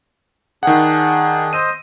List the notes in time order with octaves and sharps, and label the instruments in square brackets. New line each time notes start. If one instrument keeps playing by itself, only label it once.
[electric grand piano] D#3 F#5 [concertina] D4 G#4
[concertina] C5 D#5 E6 [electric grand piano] D#7